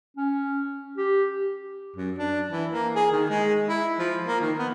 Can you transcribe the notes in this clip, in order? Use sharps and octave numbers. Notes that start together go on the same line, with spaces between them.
C#4
G4
F#2
D4
E3
A#3
G#4
D#3
G#3
E4
F3
A#3
D#3
B3